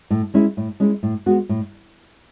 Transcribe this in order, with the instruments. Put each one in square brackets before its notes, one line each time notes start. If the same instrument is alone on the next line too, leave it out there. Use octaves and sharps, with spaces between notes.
[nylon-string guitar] A2
G#3 C#4 E4
A2
G#3 C#4 E4
A2
G#3 B3 F#4
A2